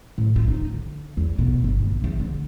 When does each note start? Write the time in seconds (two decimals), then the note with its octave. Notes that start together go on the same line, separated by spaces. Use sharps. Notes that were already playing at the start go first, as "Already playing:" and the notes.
0.18 A2
0.36 F4
0.48 D#4
0.74 D3
1.17 E2
1.38 B2
1.64 G1
1.84 A#1
2.04 E2
2.20 D3